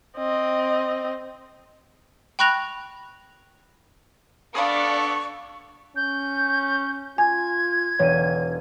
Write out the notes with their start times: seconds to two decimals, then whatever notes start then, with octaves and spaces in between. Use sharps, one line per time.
0.18 C4 D#5
2.39 G5 B5 C#6 F#6 A#6 F7
4.55 B3 D4 A4 D5 F5 B5 C#6 D#6
5.96 C#4 G6
7.18 F4 G#5 G#6
7.99 E1 D3 C#5 D#7